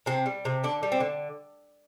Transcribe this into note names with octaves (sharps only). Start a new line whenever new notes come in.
C3 C4
G3
C3
D3 D4
G3
C4
D3